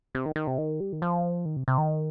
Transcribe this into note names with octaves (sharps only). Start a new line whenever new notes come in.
C3
D#3
D#3
C3
D#3
G3
D#3
F3
D#3
C3
C3
D#3